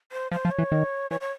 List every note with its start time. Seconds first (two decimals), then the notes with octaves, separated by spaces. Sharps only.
0.12 C5
0.32 F3 C5
0.45 F3
0.51 C#5
0.59 E3
0.72 D#3
1.11 E3 C#5
1.21 C#5